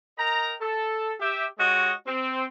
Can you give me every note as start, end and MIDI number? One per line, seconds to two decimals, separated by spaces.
0.18 0.54 70
0.18 0.54 75
0.18 0.54 79
0.18 0.54 82
0.60 1.13 69
1.20 1.45 67
1.20 1.45 76
1.59 1.92 56
1.59 1.92 66
1.59 1.92 67
1.59 1.92 73
1.59 1.92 75
2.06 2.44 60